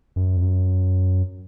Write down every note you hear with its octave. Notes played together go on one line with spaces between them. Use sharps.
F#2
F2
F#2